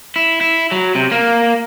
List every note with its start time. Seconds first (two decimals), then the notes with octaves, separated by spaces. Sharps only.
0.16 E4
0.41 E4
0.72 F#3
0.95 C3
1.12 A#3